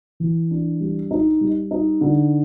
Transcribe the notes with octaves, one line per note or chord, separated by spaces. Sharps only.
E3
D4
G3
D#4
G3
D#4
D3